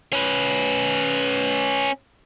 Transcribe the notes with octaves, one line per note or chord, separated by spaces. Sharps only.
C#4 B4